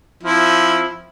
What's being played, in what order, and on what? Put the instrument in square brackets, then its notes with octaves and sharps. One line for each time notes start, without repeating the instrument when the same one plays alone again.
[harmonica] F3 C4 E4